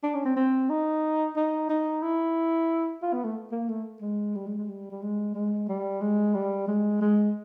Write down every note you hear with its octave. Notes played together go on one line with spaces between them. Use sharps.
D4
C#4
C4
C4
D#4
D#4
D#4
E4
F4
B3
A3
A#3
A3
G#3
G3
G#3
G#3
G3
G3
G#3
G#3
G3
G#3
G3
G#3
G#3